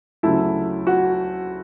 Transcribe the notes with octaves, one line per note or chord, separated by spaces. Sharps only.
D2 C#3 F#3 A3 E4
F#4